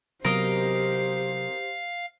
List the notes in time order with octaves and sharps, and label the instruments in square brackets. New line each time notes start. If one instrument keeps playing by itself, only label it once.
[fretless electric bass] C3 F#3 B3 [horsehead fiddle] G4 C5 [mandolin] A#4 D#5 [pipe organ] F5